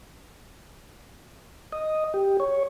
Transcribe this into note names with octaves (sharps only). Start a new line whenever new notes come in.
D#5
G4
C#5